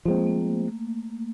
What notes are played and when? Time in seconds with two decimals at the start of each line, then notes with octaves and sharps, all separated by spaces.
0.05 F3 G#3 A#3 C4
0.17 A3
0.26 A#3